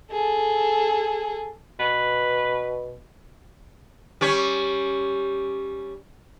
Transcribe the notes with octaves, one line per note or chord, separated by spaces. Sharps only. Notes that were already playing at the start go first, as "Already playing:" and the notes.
G#4 A4
B2 B4
G3 C#4 C#5